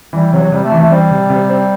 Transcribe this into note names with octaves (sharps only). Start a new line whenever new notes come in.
E3 G3
C3 F#3
F#3
C3 G3
A3
E3
A3
G3 C4
C3
C3
C4